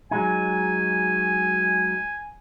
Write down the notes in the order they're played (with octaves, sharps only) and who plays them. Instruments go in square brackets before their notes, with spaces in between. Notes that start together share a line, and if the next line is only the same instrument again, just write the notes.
[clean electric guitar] F#3 G#3 D#4 [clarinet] G#5